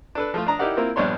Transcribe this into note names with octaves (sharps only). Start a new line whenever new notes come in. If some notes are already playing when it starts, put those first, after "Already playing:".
D4 A4 B4
F3 A3 F4
D4 A#5 D#6
D#4 E4 G4 A#4 D5 F#5
A#3 C4 E4 F4 A#4
A#1 G2 B3 D4 C#5 C6